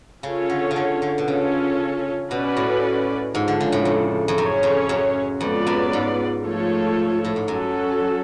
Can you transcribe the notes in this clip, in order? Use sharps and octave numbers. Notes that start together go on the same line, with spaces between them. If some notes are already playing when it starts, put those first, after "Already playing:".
C#3 C#4 F4 A4 C#5
D3
C#3
D3
D3
B2
C#3 C#4 F4 A4 C#5
B2 C#4 F#4 B4 D5
A2
G#2 F3 G#3 D4
D3
C#3
A2
F2
F2
F#2 C#4 G#4 C#5
F2
F#2
F2 G#3 B3 F4 B4 D5
F#2
G#2
F3 A3 F4 A4 C#5
A2
G#2
F#2 F#3 C#4 F#4 A4